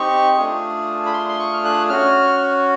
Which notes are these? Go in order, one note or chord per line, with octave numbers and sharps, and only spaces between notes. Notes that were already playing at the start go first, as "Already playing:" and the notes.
Already playing: C4 D#4 G4 C#6
A3 D4 F4 G#4
B5
C6
C6
C#6
F6
F#6
C#4 F#4 F6